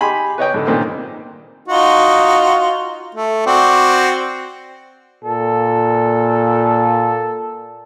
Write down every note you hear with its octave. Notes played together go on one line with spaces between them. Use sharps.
D#4 G4 G#4 G#5 B5 C6
B4 C#5 D#5 G5
G#2 D3
G2 A#2 D#3 C4
D#4 F4 F#4
A3
C4 F#4 D5
A#2 A4